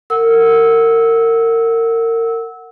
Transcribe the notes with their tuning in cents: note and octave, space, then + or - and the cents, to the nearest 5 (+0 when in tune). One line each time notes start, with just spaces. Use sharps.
A#4 -30 F#5 +0 E6 -20